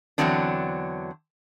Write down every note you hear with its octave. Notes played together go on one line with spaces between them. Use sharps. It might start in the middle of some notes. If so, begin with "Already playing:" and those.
E2 D3 D#3 F#3 C4 D4